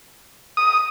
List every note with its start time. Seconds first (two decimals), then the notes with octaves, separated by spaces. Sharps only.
0.57 D#6